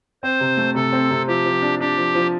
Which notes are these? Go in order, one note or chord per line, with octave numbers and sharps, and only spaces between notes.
C4 C5
C3
A3
C3 A4
C4
C3
F3 G4
F3
D4
D4 G4
F3
F3